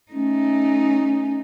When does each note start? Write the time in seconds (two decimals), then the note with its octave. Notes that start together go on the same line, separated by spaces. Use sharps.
0.12 A3 C#4 D#4